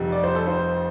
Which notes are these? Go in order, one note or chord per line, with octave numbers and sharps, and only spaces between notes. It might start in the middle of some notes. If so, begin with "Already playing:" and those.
Already playing: F1 F2 C3 G3
D5
C5
A4
C5